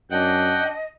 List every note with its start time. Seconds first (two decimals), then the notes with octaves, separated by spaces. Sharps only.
0.11 F#2 D4 D#5 F#5 G5